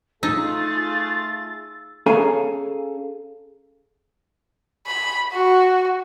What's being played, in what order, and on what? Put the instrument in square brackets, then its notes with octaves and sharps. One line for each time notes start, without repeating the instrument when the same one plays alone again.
[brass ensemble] A3 F4 G#4 [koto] D#4 [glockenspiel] E6 [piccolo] A6
[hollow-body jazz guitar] C#4 G#4 A4 F5 G#5 A#5
[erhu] B5
F#4